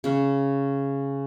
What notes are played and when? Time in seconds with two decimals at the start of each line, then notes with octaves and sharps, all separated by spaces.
0.04 C#3 C#4